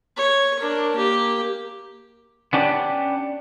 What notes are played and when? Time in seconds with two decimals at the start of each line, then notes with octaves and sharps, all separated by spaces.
0.17 C#5
0.60 D4 A#4
0.96 A#3 G4
2.53 B3 C#4 D4 G4